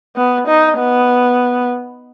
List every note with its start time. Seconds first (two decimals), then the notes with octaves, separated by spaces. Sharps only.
0.16 B3
0.47 D#4
0.78 B3